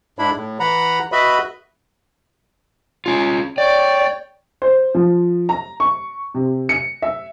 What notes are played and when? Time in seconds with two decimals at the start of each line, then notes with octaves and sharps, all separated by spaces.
0.19 G#2 D4 E4 B5
0.37 A2
0.60 E3 F#5 A#5 B5
1.12 F#4 B4 D#5 E5 B5
3.06 C#4 F4
3.58 C#5 D5 G5
4.62 C5
4.95 F3
5.49 A#5
5.80 C#6
6.35 C3
6.69 C#7
7.02 E5